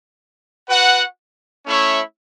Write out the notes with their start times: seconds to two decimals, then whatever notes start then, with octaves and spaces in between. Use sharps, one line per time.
0.68 F#4 B4 F#5
1.66 A3 C#4 E4 C#5 E5